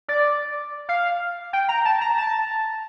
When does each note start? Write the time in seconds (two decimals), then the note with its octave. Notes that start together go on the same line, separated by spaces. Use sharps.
0.08 D5
0.89 F5
1.53 G5
1.69 A#5
1.85 A5
2.01 A#5
2.18 A5